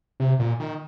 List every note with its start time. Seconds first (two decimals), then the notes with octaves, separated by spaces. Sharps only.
0.20 C3
0.39 A#2
0.60 D#3